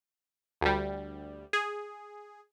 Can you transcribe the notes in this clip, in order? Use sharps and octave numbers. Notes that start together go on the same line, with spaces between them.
D2 G3
G#4